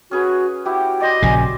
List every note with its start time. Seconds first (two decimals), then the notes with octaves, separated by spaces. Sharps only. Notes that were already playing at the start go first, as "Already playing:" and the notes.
0.11 C#4 F#4 G#4 B4
0.65 E4 F#4 G4 G5
1.00 C5 D5 D#5
1.22 A#1 C#3 G#5